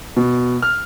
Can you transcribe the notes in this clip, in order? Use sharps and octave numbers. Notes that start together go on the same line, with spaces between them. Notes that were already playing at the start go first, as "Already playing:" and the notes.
B2
F6